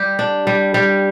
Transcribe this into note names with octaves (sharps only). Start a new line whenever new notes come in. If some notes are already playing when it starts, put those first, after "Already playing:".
Already playing: G3 G4
D4
G3
G3